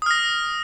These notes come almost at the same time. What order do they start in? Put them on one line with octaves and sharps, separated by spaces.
D#6 F6 A#6